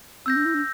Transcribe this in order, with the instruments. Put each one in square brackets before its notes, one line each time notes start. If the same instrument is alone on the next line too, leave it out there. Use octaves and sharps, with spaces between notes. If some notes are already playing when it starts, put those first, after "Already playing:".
[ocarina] C4 [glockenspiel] E6 G6 A#6
[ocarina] D4
E4
D4